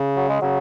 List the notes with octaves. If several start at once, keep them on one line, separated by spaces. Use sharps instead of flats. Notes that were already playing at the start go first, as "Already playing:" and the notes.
Already playing: C#3
F#3
G#3
C#3 F#3